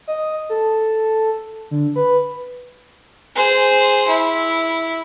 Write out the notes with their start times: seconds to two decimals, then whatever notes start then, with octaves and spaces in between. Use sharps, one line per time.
0.07 D#5
0.50 A4
1.71 D3
1.96 B4
3.36 G#4 C5
4.07 E4